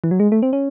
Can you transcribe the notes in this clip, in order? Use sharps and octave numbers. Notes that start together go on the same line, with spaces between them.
E3
F#3
G#3
A3
C4
C#4